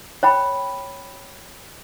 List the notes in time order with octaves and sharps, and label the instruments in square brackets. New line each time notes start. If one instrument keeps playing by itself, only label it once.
[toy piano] C#5 G5 B5